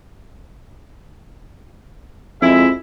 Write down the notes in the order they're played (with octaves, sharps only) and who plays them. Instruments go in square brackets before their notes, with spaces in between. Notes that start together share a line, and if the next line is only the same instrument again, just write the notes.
[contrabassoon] F2 [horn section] G#3 E4 E5